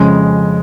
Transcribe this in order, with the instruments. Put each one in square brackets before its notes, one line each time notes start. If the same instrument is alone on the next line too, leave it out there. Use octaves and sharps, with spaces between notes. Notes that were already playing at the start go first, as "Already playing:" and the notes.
Already playing: [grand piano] F2 C#3 G#3